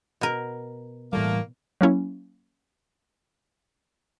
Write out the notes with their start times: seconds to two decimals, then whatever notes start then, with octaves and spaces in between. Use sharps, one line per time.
0.21 B2 A#4
1.13 A2 E3 G3 A3 A#3
1.81 F#3 A#3 C#4 E4